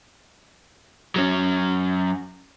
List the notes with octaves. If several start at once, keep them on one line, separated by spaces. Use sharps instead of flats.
F#3 C#4